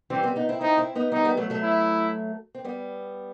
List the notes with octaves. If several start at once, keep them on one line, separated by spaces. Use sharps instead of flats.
E3 G3 C4
G3 B3
B3 D#4
C4 E4
C4 D#4 E4
C4 E4
B3 D#4
G3 B3 D#4
G3 B3
F#3 A3
F#3 A3
E4
C4
G3 B3